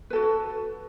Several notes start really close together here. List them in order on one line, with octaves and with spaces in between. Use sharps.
B4 A4 F#4